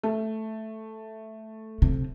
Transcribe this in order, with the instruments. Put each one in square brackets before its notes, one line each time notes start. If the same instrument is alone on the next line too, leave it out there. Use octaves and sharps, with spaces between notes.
[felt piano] A3
[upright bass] C3